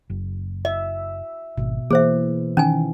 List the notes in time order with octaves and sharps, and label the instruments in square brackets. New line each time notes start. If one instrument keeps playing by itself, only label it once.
[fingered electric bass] F#1
[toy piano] D#5 [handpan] E5
[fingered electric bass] G#1 [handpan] B2
[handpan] E3 [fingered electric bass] A#3 [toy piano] G#4 C5 E5
[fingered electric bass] D#3 [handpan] E3 [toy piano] C#4 D#4 G#5